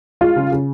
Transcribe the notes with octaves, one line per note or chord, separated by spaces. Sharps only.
G#3 F4
C#3
C#3